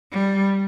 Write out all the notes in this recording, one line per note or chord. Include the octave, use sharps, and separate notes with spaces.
G3